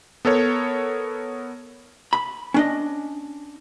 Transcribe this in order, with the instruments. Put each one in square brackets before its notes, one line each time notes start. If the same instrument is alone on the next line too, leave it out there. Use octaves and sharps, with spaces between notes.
[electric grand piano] B3 A4 A#4 C#5
[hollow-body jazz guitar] B5
C#4 D4 D#5